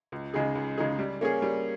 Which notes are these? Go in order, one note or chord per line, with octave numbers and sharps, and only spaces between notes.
C#2
C#3 G#3 D#4 G#4
C#2
C#3 G#3 D#4 G#4
G3
A#3 C#4 G#4
G3